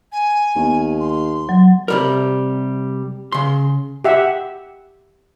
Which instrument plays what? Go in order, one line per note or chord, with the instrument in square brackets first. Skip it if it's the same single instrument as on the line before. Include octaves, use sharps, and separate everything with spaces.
[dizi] G#5
[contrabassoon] D#2 [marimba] B3
[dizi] C6
[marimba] F#3
[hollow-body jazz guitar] C3 G3 A#4
C#3 C6
[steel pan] G4 E5 F#5